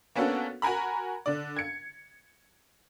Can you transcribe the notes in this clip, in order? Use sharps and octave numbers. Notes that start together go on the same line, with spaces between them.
A#3 B3 C#4 D4 F#4 A4
F#4 A#4 G#5 A#5 B5
D3 D5
G#6 C#7